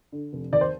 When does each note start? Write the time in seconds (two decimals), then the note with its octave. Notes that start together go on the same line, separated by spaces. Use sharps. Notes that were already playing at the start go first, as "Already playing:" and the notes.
0.12 D3
0.33 F1
0.53 D#2 D5
0.61 C5